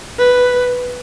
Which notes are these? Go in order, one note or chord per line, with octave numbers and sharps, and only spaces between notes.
B4